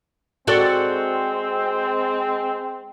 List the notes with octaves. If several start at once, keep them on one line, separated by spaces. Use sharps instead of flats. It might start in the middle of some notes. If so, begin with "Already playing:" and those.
G#3 C4 F#4 A4 D5